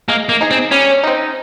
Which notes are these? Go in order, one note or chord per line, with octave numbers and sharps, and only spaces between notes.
G#3 A#3
A#3
D#4 G#4
C4
G3 C#4
C4 D#4